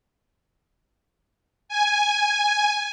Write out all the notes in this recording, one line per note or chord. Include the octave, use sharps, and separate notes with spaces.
G#5